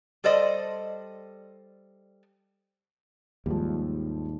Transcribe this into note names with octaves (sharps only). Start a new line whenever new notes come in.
G3 A4 C5 D5 D#5
D#2 G#2 F3 G3